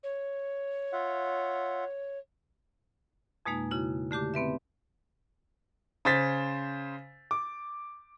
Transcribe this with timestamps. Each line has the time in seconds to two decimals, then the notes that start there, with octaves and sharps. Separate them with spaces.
0.03 C#5
0.93 F4 E5 F#5
3.46 F2 B2 G#3 A#3 D#4
3.71 C#3 E4 F#4
4.11 D3 A3 G4 D6
4.34 B3 C4 B4 E5
6.05 C#3 C5 A6 B6
7.31 D6